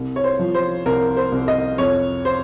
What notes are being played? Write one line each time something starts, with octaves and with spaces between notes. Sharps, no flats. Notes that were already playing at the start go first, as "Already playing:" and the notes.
Already playing: C2
C#5
C5
F3
C5
C2 A#4
C5
C2
D#5
F2 C#5
C5